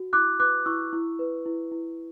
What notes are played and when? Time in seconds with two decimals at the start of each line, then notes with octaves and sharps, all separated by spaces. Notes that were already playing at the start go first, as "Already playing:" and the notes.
Already playing: F#4
0.13 E4 D6 F#6
0.39 B4 D6 F#6
0.66 E4 C#6 E6
0.93 E4
1.19 B4
1.46 E4
1.72 E4